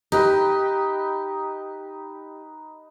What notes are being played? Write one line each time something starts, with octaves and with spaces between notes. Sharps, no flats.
D#4 G4 B4